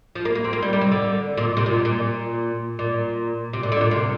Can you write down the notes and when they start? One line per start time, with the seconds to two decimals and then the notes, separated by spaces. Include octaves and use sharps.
0.15 F3
0.25 A#3
0.35 A#3
0.44 C4
0.53 A#3
0.62 G3
0.73 G3
0.81 C3
0.91 D3
1.37 A#2
1.57 C3
1.66 A#2
1.85 A#2
2.79 A#2
3.53 C3
3.63 A#2
3.72 D3
3.81 A#2
3.91 C3